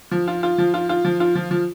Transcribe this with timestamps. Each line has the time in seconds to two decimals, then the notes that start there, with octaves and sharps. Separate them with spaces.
0.11 F3
0.28 F4
0.43 F4
0.58 F3
0.74 F4
0.89 F4
1.05 F3
1.20 F4
1.35 F3
1.51 F3